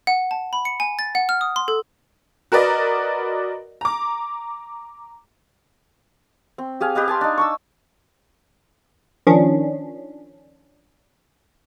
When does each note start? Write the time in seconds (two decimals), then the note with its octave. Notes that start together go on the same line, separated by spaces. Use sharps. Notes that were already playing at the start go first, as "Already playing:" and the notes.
0.07 F#5
0.31 A5
0.53 B5
0.65 C#7
0.80 G#5
0.99 A6
1.15 F#5
1.29 F6
1.41 D#6
1.56 C6
1.68 A4
2.52 F#4 A#4 B4 D5 D#5
3.81 A#5 D6
6.58 C4
6.80 G4 G#4 F5
6.95 G4 B4 D#5 F5
7.08 G#5 A5 C6
7.21 D4 D#4
7.38 C#6 D6 E6
9.27 D#3 F3 C#4 D4